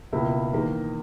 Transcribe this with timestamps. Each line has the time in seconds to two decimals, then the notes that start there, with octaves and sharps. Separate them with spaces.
0.12 C#2 B2 A#3 E4
0.53 E2 D#3 A#3 D#4